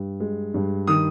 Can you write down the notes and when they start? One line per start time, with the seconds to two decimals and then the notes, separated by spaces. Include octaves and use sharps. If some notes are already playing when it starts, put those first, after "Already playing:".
Already playing: G2
0.20 G#3
0.54 G2
0.87 D#3 D#6